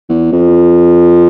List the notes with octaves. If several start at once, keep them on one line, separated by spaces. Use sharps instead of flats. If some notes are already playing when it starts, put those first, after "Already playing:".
E2
F2